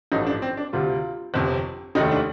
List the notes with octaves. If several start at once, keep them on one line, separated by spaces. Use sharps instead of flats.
A1 G2 F3 A3 D#4
D4
C4
D4
D2 C3 G3 F4
G1 F2 C3
F1 D#2 D#3 A3 D#4
D4